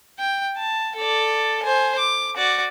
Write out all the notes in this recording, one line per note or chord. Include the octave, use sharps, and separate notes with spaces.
G5
A5
A4 D5
C5 G#5
D6
F#4 D5